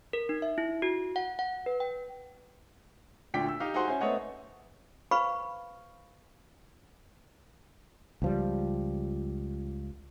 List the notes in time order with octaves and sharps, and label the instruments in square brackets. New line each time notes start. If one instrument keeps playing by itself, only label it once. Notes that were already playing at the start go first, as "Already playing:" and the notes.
[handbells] A#4
D#4
E5
E4
F#4
F#5
F#5
B4
G5
[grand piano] D2 A#2 D4 G5 B6
E6
D#4 G4 F5
D#4 F#4 G#4 C5 F#5 C6
C#4 E4 C5 G#5
A3 B3 C4 C#5 D#5 F#5
[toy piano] B4 C5 F5 B5 C#6
[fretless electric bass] C#2 F3 G3